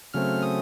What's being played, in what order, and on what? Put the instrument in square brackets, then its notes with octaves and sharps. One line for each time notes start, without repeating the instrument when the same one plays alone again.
[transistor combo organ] C#3 F#3 A3 C4 F6
D#6